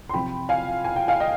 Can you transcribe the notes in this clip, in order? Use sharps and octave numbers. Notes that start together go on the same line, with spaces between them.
C6
C3 F3 G5 B5
F5 G#5
G#5
G5
F5 G#5
D#5 G5